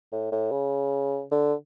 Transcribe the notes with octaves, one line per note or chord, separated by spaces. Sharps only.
A2
A2
C#3
D3